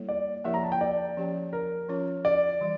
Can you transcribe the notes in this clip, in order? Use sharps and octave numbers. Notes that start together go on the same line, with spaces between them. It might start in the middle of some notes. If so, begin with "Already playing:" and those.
Already playing: G3 A#3 E4 A4 C#5
D5
F3 A#3 E4 G4 A#4 E5
A#5
A5
G5
D5
F3 C#4 G4
A#4
F3 C#4 F4 C#5
D5
E3 G3